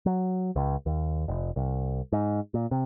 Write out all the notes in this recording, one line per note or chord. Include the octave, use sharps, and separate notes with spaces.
F#3
C#2
D#2
F1
C2
G#2
A#2
C3